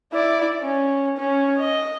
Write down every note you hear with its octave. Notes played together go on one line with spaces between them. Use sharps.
E4 D5
C#4
C#4
D#5